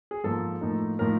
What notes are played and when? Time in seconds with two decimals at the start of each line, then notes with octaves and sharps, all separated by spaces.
0.11 G#4
0.24 G#2 F3 A#3 A4
0.61 A2 F3 A#3 D#4
0.99 A2 F3 A#3 D#4 A#4